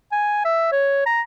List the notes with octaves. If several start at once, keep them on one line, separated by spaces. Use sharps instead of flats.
G#5
E5
C#5
A#5